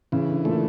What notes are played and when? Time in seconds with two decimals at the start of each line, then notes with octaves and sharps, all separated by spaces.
0.12 C#3 E3
0.29 D3
0.45 A#2 A3